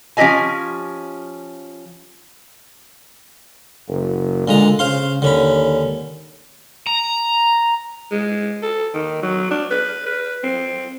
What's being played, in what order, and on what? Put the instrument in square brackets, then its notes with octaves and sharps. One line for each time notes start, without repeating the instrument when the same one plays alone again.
[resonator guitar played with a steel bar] F3 C#4 G4 G#4 D#5 G#5
[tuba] F#1
[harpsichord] A#2 G#3 A#5 [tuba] D3
[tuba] C#3 [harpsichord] C5 F5 C6
[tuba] D#2 [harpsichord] D3 C#4 B5
[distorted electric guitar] A#5
[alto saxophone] G#3
A4
D#3
F#3
D4
B4
B4
C4